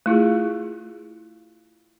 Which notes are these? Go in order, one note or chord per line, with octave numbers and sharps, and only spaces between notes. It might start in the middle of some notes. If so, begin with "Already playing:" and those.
A3 E4 F4 G#4